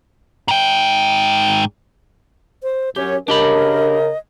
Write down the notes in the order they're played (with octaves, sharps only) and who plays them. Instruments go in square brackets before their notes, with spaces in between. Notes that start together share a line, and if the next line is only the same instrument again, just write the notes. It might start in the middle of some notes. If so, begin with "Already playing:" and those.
[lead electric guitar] G#2 G5
[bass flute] C5
[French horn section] F#2 C#4 [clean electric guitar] G4 [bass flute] C#5
[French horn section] C#3 A#4 [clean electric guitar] D4 G4 B5 [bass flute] D#5